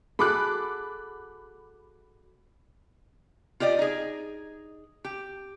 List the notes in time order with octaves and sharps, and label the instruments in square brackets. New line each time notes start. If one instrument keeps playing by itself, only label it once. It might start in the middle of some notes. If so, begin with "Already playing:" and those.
[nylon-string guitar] F#4 G#4 A4 [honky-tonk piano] B5 D6 F#6
[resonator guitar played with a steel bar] F4 G4 D5 D#5
D#4 G#4
G4